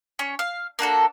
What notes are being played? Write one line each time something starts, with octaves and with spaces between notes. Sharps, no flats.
C#4 C#5
F5
A#3 D4 F#4 A4